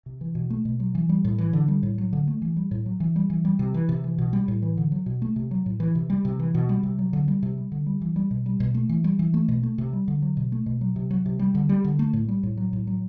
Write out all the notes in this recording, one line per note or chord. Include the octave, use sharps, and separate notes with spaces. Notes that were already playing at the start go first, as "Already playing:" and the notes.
C3
E3
B2
A3
B2
F#3
E3
G3
A2
E3
D3
G3
A2
F#3
D3
A3
E3
G3
A2
F#3
E3
G3
E3
G3
C3
E3
C3
E3
B2
G3
A2
E3
D3
F#3
B2
A3
C3
F#3
A2
E3
C3
G3
C3
E3
B2
G3
C3
F#3
D3
G3
C3
G3
D3
G3
E3
G3
B2
G3
B2
A3
E3
G3
E3
A3
B2
A3
C3
G3
D3
F#3
B2
A3
B2
F#3
C3
F#3
C3
G3
D3
G3
D3
A3
A2
G3
A2
F#3
A2
F#3